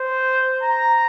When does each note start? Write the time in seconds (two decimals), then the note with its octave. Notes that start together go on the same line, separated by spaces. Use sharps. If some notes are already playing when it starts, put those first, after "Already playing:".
Already playing: C5
0.63 A#5